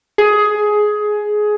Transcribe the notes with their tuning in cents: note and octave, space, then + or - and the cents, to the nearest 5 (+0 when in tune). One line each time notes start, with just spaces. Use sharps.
G#4 +15